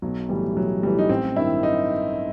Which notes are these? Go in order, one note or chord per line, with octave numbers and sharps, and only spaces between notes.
B1 F#3
A2 E3 G3
B1 F#3
A2 E3 G3
D#4
A1 C4
G2 D#3 E4
D#4